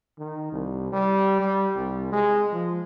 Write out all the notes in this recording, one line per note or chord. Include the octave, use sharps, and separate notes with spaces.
D#3
C2
G3
G3
C2
G#3
F3